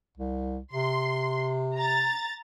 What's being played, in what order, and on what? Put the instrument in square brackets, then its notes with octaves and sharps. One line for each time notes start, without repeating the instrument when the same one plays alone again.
[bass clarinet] C2
[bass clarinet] C3 [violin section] C6
[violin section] A#5 A6